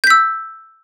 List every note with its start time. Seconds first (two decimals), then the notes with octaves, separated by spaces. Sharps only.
0.04 G6
0.07 B6
0.10 E6